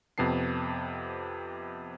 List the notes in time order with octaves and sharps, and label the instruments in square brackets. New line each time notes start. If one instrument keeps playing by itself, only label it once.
[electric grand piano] F2 C3 B3 A5 C7